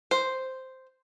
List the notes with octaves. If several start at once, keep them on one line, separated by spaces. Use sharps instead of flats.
C5